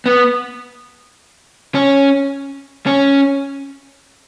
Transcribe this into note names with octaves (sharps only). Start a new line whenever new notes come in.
B3
C#4
C#4